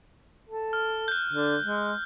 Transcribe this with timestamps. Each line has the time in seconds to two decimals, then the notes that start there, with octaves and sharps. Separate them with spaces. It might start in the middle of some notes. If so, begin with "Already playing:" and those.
0.49 A4
0.73 F6
1.08 F#6 G6
1.33 D3
1.63 G#3